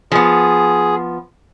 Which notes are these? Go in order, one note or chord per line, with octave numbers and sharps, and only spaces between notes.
F3 B3 G#4